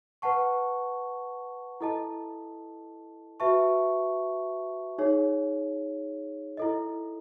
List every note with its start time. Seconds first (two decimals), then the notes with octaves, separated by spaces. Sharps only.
0.22 B4 F#5 A5 C#6
1.81 E4 A4 D#5 A5
3.40 F#4 B4 E5 A5 C#6
4.98 D#4 G#4 C#5
6.57 E4 A4 D#5